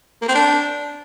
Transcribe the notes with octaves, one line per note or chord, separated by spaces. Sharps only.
A#3
C4
D4